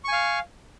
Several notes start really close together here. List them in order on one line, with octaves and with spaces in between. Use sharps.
C#6 G#5 F5